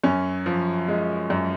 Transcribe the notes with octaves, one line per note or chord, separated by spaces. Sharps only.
F#2 C#4
F3
G#3
F#2